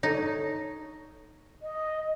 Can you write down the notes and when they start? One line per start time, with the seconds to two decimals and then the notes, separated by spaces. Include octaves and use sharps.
0.03 D#4 A4 C#5
1.62 D#5